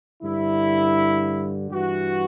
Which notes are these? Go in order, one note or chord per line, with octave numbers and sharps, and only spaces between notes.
G2 D3 E4
G2 E3 F#4